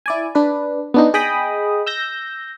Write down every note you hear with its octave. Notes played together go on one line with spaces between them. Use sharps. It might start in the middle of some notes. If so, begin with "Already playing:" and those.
E4 D5 G#5
D4 B4
B3 D4 D#4
G#4 D#5 G5 B5 D#6
E6 G6 A#6